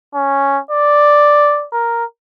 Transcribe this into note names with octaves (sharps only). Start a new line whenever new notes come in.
C#4
D5
A#4